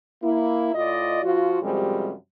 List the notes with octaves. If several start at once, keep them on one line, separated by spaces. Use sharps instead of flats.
A#3 E4
A2 F4 D5 D#5
F3 F4 F#4
F#2 C3 F3 G3 G#3